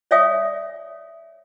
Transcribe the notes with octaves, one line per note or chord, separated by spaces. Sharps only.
C#5 D5 E5 F5 G#5 D#6